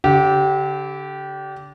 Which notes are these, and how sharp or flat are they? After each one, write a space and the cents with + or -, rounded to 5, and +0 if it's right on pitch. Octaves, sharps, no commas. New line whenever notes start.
D3 -35 G4 -20